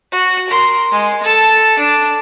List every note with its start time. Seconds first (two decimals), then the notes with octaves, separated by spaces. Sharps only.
0.12 F#4
0.49 A#4 C6
0.92 G#3
1.23 A4 A5
1.79 D4